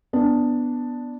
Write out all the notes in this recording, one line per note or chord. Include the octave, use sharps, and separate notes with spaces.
B3 D4